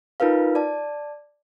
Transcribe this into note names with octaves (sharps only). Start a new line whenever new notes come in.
D#4 F4 A#4 B4 F5
D5 A5